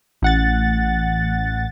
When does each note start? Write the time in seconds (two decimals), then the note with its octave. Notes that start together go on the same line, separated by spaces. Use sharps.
0.22 A1 F#5 A6